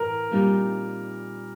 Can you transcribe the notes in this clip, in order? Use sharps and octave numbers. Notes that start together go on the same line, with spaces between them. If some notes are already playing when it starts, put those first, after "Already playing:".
Already playing: A2 E3 A#4
A#2 G3 C4 D#4